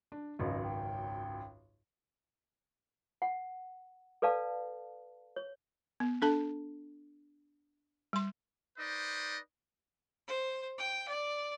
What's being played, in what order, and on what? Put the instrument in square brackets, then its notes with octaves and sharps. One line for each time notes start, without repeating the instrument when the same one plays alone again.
[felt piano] D4
[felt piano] G#1 C#2 F#2 [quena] D#5
[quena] G5
[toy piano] F#5
A4 B4 D5 F5 A5
C#5
[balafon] B3
D4 A4 A5
G3 C6
[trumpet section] D#4 B4 C5 D5 D#5
[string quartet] C5
G5
D5